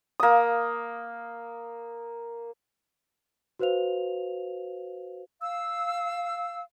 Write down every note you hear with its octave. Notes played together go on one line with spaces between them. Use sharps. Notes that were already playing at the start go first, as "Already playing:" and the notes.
A#3 D#6
F#4 B4 C5 F5 F7
F5 E6